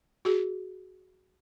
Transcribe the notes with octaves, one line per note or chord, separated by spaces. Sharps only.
F#4 G#4